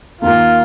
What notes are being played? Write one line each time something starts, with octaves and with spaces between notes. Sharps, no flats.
D#2 D#3 A#3 F4